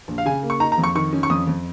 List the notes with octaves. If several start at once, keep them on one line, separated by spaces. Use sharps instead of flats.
A#1
F5
C#3 G#5
A#3
C#6
D#4 A#5
A#5
F2
C#6
D#3 C#6
C#4
C#6
F2 D#6
F2